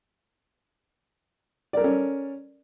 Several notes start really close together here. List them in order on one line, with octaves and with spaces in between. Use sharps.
D5 A#4 A4 C#4